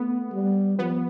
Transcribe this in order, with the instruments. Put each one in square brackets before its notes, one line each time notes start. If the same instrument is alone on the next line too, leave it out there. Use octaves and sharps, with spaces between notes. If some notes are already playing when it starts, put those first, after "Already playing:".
Already playing: [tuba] A3 [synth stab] B3
[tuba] G3
[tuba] F3 [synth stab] B3